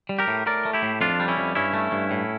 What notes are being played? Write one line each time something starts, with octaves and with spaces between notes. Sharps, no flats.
G3
G4 A#4
A2
A2 A#4 D5
A3
E4 G4
A2
F2 D4 F4
G3
C#4 E4
F2
G2 C#4 E4
A3
G2
A2